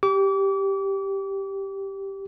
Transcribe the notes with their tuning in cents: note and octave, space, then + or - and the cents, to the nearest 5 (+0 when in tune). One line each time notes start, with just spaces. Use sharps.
G4 +0 D6 -35